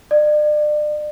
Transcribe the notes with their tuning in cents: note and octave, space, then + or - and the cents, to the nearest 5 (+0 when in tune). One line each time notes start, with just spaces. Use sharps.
D5 +35